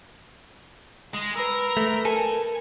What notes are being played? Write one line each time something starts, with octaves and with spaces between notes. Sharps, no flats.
G#3
A#4 B4 B5 E6
A3
A4 A#4 G#5